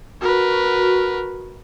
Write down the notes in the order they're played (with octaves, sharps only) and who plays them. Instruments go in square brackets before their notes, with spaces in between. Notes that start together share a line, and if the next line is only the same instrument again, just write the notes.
[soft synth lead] F#4 [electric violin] A#4 B4